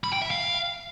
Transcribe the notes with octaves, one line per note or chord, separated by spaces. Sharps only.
B5
G5
E5
F5